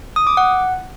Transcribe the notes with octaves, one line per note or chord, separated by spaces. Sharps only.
D#6
D6
F#5